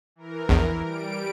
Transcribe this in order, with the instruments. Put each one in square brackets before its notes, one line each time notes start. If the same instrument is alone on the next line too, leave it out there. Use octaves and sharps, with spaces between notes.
[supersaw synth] E3 A#4
[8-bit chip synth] A#1 E2
[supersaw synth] G3 D7